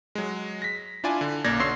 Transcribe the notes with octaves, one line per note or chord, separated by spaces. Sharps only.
F#3 G#3
A#6 B6
D4 E4 F4 D5 G#5
D3
B1 F#2 A#3 D5 G#6 A#6
B2 D3 C#5 C6 E6 C7